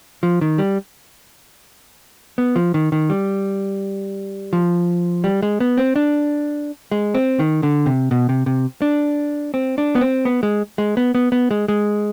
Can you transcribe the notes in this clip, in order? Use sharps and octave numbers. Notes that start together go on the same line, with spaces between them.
F3
D#3
G3
B3
F3
D#3
D#3
G3
F3
G3
G#3
B3
C4
D4
G#3
C4
D#3
D3
C3
B2
C3
C3
D4
C4
D4
B3
C4
B3
G#3
G#3
B3
B3
B3
G#3
G#3